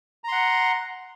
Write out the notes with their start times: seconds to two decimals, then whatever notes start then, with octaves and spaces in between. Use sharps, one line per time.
0.24 A#5
0.28 C6
0.32 F#5